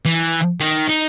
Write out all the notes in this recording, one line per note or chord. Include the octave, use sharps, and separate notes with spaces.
E3
D#3
D#4